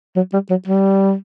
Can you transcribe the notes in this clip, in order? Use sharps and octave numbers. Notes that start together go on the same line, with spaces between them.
F#3
G3
F#3
G3